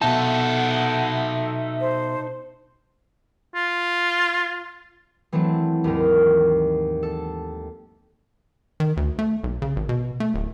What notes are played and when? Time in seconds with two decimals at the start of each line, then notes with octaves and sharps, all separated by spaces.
0.02 B2 D#4 A4 E5 F#5 A5
1.81 C5
3.55 F4
5.32 E3 F#3 A3 C4 A4
5.84 D#2 G#2 A#4
7.03 A4
8.80 D#3
8.97 D2
9.19 A3
9.44 B1
9.62 C#3
9.76 G#1
9.89 B2
10.20 A3
10.34 D1